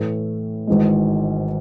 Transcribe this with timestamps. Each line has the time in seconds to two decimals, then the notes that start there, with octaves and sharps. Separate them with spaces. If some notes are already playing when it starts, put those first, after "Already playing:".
Already playing: A2 E3 A3
0.67 G#1 G#2 E3 G#3